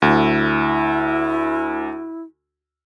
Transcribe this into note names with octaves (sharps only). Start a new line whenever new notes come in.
D2 E4